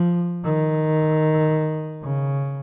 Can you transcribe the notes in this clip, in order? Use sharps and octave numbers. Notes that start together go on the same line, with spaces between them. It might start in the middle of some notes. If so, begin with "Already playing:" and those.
Already playing: F3
D#3
C#3